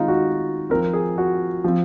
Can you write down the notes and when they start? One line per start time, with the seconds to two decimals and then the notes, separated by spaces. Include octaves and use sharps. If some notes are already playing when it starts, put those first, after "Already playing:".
Already playing: D#3 G#3 C4 D#4 F4
0.08 F#4
0.70 F3 C4 A#4
0.93 G#4
1.18 F#4
1.64 F3 C4